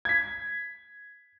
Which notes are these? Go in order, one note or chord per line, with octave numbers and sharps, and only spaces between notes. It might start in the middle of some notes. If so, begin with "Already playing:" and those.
G#6 B6